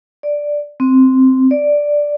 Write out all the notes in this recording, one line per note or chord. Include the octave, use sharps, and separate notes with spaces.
D5
C4
D5